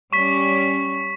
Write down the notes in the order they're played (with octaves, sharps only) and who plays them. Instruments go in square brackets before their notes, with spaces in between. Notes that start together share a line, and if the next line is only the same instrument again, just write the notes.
[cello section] G3 C#4 [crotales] C#6 B6